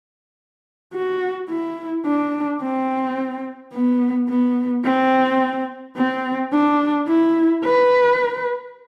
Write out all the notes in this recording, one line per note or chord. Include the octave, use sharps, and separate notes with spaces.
F#4
E4
D4
C4
B3
B3
C4
C4
D4
E4
B4